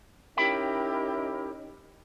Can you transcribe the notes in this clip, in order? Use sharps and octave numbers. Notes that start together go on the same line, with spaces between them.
C#4 D#4 E4 G4 A#4 E5 G5 B5